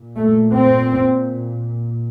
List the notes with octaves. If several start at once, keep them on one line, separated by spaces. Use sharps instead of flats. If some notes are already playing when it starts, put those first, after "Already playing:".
Already playing: A#2
A3
C4